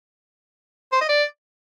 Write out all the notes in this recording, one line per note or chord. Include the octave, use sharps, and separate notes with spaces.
C5
D#5
D5